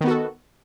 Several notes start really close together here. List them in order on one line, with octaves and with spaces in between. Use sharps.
D#3 B3 F#4 A4